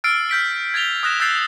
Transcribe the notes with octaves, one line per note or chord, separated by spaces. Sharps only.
E6 F6 A6 C7 D7
F6 G6 B6 D7
G#6 A6 B6 F7 G7
D#6 F#6 A#6 E7
E6 F#6 G6 A6 C7